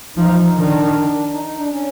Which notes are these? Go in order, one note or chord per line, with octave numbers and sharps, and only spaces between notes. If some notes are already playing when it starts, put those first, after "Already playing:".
F3 D#4
D#3 D4
D#4
D#4
D4
C#4